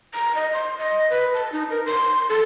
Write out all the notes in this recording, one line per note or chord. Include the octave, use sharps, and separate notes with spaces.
A#5
D#5
C6
D#5
B4
A5
D#4
A#4
C6
A4